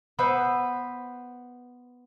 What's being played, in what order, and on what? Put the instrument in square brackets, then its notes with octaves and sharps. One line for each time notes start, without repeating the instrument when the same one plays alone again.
[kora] B3 B4 C5 E5